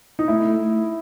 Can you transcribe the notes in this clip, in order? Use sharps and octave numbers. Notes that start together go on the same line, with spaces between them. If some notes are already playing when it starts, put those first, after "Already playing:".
D#4
A3 E4